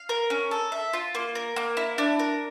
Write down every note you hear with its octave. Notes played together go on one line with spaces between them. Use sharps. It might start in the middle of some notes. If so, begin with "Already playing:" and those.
Already playing: F5
A#4
C#4
A4
E5
F4
A#3
A#4
A#3
E4
D4
A#4